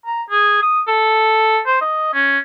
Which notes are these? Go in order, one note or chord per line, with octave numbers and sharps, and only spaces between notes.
A#5
G#4
D#6
A4
C5
D#5
C#4